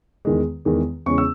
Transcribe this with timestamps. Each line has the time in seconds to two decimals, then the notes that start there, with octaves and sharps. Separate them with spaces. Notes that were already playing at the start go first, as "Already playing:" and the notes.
0.25 E2 D#3 G#3
0.65 E2 D#3 G#3
1.06 E2 C#3 G#3 C#4 C#6
1.18 E6